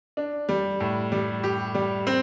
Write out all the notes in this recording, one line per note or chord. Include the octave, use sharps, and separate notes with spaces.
D4
G3
A2
G3
G4
G3
C4